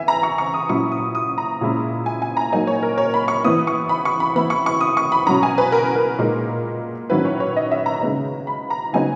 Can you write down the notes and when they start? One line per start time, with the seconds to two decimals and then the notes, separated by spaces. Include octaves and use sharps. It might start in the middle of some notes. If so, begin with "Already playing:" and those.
Already playing: E3 B3 E5 G#5
0.08 A#5
0.23 C#6
0.38 C#6
0.54 D#6
0.69 A#2 F#3 C#4 E4 C#6
0.92 D#6
1.15 D#6
1.38 A#5
1.61 A#2 G#3 C#4 E4
2.06 G#5
2.22 G#5
2.37 A#5
2.53 F#3 A#3 D#4 G#5
2.67 C#5
2.83 A#4
2.98 C#5
3.14 B5
3.28 C#6
3.44 E3 B3 E4 D#6
3.67 C#6
3.89 B5
4.05 C#6
4.20 B5
4.35 E3 B3 E4 B5
4.50 C#6
4.66 C#6
4.81 D#6
4.97 C#6
5.12 B5
5.27 B2 F#3 C#4 A#5
5.43 G#5
5.58 B4
5.72 A#4
5.96 A#4
6.19 A#2 G#3 D#4
7.10 D#3 F#3 C#4 E4 B4
7.25 C#5
7.40 C#5
7.56 D#5
7.71 E5
7.86 A#5
8.01 C#3 G#3 B3 D#4
8.47 B5
8.70 A#5
8.93 C#3 F#3 B3 D#4 G#5